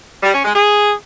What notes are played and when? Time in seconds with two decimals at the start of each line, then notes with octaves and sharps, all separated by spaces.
0.23 G3
0.33 C#4
0.44 G#3
0.54 G#4